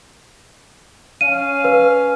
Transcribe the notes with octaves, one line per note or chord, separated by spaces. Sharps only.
C#4 F5 D#7
B4